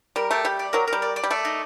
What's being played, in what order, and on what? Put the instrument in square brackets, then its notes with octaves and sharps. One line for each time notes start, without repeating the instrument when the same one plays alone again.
[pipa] G3 [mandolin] A#4
[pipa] A3 [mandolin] G4
[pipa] G3 [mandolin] G4
[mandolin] D5
[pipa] F#3 [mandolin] A#4
[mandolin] A#4
[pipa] G3
[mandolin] D5
D5
[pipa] G3
[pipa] A3 [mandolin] D5
[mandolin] D#4